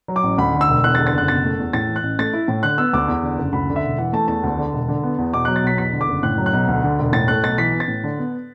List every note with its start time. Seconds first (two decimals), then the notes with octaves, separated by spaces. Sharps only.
0.08 F#3
0.16 D6
0.23 A1
0.38 D2 B5
0.54 D3
0.61 E6
0.68 E1
0.84 E2 F#6
0.95 A6
0.99 D3
1.07 A6
1.13 F#1 F#6
1.28 B2 A6
1.44 A3
1.59 E2
1.73 A2 A6
1.89 E3
1.96 F#6
2.03 A1
2.19 A3 A6
2.33 E4
2.48 A2
2.63 D3 F#6
2.78 B3 E6
2.93 D2 D6
3.08 E2
3.23 D3
3.38 F#1
3.53 D2 B5
3.69 D3
3.76 E5
3.84 E1
3.98 E3 F#5
4.13 A3 A5
4.28 E2 A5
4.43 D2
4.58 D3
4.73 E1
4.88 D3
5.03 B3
5.18 E2
5.34 B2 D6
5.45 F#3 F#6
5.56 A6
5.63 B1 B6
5.78 E2 B6
5.93 D3
6.01 D6
6.09 F#1
6.23 A2 F#6
6.38 F#3
6.46 F#6
6.53 B1
6.68 D2
6.84 D3
6.99 E1
7.13 A2 A6
7.28 A3 F#6
7.43 B1 A6
7.58 E3 B6
7.73 B3
7.80 A6
7.88 A2
8.04 D3
8.18 B3